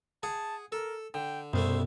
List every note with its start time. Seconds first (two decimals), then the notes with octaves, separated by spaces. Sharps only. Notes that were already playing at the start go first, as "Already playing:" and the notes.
0.23 G#4 F#5 A5
0.72 A4 A#4
1.14 D3 G5
1.53 C2 F#2 B2 G3 A3 C5